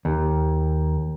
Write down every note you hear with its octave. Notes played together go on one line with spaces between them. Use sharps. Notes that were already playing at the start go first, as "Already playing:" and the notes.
D#2